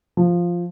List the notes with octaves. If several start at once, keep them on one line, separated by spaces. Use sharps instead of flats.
F3